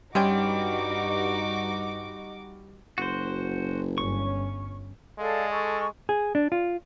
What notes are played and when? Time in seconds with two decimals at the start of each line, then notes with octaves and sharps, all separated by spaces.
0.15 G2 G3 G#3 C#4 D#4 F#4 G5 D6
2.98 F#1 F#4 C5
3.98 G1 C#4 C#6
5.18 G#3 A4 D5 F5
5.50 A4 C#6
6.09 G#4
6.35 D4
6.52 F4